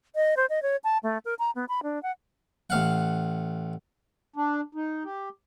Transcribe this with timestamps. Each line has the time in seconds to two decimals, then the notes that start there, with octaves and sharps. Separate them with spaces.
0.16 D#5
0.37 C5
0.49 D#5
0.62 C#5
0.84 A5
1.03 A3
1.25 A#4
1.39 A#5
1.55 B3
1.69 B5
1.83 D4
2.03 F#5
2.70 A1 F5 F#5
4.36 D4
4.75 D#4
5.05 G4